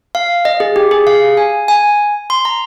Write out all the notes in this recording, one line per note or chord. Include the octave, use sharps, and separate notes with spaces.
F5
D#5
G#4
G4
G#4
F5
G#5
G#5
C6
A#5